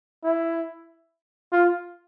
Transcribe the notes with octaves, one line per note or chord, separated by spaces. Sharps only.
E4
F4